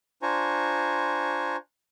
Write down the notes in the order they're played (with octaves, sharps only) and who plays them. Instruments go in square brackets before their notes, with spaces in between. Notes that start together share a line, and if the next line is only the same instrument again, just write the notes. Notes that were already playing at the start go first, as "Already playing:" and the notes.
[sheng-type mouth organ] D4 F4 C5 G#5 A#5 C#6